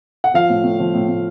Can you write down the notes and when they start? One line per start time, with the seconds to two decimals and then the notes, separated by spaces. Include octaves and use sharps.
0.24 F#5
0.34 F3 F5
0.50 A2
0.64 A2
0.80 F3
0.94 A2
1.09 A2